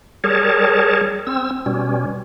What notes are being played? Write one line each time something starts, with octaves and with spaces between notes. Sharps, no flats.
G3 G#4 A#4 C#5 A5
C4 E6
B2 G3 C#4